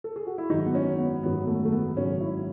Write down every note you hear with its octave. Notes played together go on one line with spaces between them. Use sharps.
A4
G#4
F#4
E4
G#1 F#2 D#3 F#3 D#4
B3
C#4
B3
G#1 F#2 D#3 F#3 B3
A3
A3
B3
G#1 F#2 C#3 F#3 C#4
E4